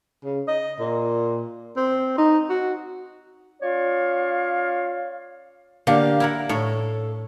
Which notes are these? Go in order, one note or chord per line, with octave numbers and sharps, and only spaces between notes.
C#3
D#5
A#2
C4
D#4
F#4
C#4 F4 C#5 D5 F5
D3 A#3 G4 F5
E4 A#4 F#5
A2 A4 C#5